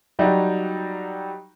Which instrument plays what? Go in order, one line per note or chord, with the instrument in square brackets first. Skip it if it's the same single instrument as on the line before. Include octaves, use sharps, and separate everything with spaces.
[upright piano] F#3 G3 D#4 F#4